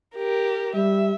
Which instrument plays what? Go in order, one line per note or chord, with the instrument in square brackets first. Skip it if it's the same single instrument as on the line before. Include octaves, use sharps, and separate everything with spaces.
[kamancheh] G4 A#4
[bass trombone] G3 [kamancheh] E5